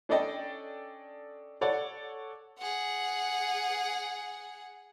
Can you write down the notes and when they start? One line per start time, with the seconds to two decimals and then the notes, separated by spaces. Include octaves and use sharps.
0.09 C#4 D4 A4 D5 D#5 G5
1.61 A4 C#5 D5 F#5
2.58 G#4 F#5